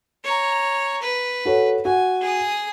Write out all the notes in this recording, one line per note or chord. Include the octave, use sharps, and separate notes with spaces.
C#5 A#5
B4
F#4 A4 C#5
F#4 G#5
G#4 D#6